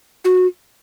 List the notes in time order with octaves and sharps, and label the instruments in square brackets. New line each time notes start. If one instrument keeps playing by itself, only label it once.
[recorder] F#4